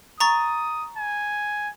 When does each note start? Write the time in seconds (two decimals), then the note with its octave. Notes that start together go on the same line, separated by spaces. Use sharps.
0.20 A#5 C#6 D#6 A6
0.97 G#5